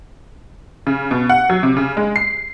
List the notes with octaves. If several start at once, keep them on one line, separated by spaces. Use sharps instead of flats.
C#3
B2
F#5
F#3
C3
C#3
G#3
C7